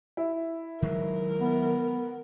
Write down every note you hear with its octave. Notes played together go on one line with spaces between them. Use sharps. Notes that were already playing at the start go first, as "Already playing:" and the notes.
E4
D#3 F#3 G#3 A#4
B3